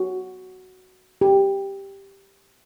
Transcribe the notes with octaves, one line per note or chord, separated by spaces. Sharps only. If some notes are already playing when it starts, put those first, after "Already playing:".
Already playing: F#4
G4